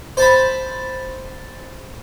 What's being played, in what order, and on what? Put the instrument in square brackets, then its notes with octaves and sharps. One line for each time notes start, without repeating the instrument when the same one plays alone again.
[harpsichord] C5 A5 B5